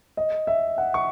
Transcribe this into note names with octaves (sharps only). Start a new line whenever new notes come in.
D#5
E5
F#5
C#6